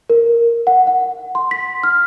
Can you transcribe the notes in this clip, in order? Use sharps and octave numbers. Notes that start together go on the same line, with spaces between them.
A#4
F#5
F#5
C6
B6
F6